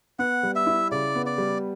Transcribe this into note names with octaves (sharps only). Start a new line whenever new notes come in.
B3 F#5
G3
E5
E4
C#3 D5
B3
D5
G3